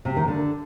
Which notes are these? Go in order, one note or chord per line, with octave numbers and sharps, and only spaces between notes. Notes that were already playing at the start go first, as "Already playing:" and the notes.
C3
D#3
D3